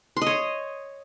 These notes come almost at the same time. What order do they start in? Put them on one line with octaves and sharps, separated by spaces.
C6 D#5 C#5